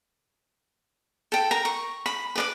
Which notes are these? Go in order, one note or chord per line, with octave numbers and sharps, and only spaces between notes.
A4 G5
A#4 A#5
C#6
B5
B4 D5 D6